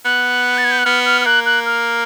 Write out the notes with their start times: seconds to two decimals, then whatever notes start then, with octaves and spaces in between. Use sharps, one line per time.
0.05 B3 F#6
0.58 A6
0.65 G#6
0.71 G6
0.78 F#6
0.85 B3 F6
1.06 F6
1.21 F6
1.26 A#3 F#6
1.46 F#6
1.66 F6